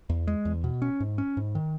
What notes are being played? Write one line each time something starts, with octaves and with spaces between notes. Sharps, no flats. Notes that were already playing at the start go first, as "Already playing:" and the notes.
E2
G#3
E2
B2
C#4
G#2
C#4
G#2
D#3